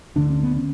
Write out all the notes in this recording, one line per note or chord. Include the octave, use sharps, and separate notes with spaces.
D2 D3 D4
C#4
B3
C#4